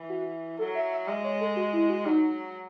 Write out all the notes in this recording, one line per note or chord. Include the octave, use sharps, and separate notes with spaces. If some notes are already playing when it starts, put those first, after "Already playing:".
Already playing: E3
F#4
F#3 A4
E5
E5
G#3 E5
C#5
A4
F#4
E4
F#4
F#3 D#4